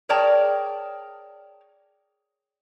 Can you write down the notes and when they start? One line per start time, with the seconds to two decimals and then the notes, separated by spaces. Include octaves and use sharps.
0.09 G#4 A#4 C#5 D5 G5 A5